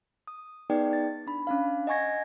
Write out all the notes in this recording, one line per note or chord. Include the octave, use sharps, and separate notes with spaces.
D#6
B3 D#4 G#4 B4 D5 G5
A6
D4 B5
C#4 D4 F5
D#5 F#5 G#5 C#6 G#6 A#6